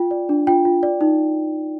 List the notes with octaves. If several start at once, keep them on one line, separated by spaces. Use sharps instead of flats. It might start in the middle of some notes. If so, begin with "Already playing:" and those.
Already playing: F4 G5
D5
D4
F4 G5
F4
D5
D#4